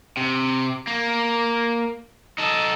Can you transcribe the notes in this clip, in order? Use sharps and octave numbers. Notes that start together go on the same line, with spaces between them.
C3
A#3
D#4 A4